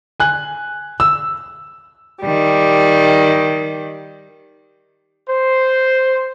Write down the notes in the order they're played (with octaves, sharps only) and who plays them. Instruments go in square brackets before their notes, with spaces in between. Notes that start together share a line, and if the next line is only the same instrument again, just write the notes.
[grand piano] G#5 F#6
E6
[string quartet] D#3 G3
[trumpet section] C5